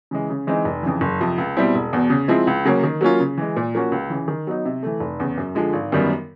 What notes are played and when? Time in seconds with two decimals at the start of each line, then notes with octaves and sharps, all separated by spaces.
0.11 C#3 E3 G#3
0.30 C#3
0.47 E3 G#3 C4 D#4
0.65 F1
0.83 F2 C#3 E3
1.01 F#1
1.20 F2 C3 F3
1.38 C#2
1.57 B2 G3 C4 E4
1.75 E1
1.93 E2 B2
2.10 C#3
2.28 F3 G#3 C4 E4
2.47 C#2
2.65 C#3 F#3 A#3 C#4
2.84 D#3
3.01 F#3 A#3 C#4 F4
3.20 C#3
3.38 E3 G#3
3.56 A#2
3.75 F3 A#3 C#4 F#4
3.92 C#2
4.10 C#3 E3
4.28 D#3
4.47 F#3 B3 D#4
4.65 C3
4.83 E3 A3
5.00 F1
5.20 E2 C#3
5.38 F#2
5.55 D3 F3 G#3
5.73 G#1
5.92 F#2 D#3 G3 B3